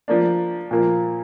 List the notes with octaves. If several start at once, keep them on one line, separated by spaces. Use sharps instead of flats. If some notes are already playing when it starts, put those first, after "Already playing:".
F3 A#3 D4
A#2 F3 A#3